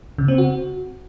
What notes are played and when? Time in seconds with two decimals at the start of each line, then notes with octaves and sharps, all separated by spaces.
0.18 C#3
0.28 C4
0.38 F#4